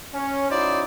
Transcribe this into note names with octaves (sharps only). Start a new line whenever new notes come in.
C#4
C#4 D#4 E4 F#4 C5 D5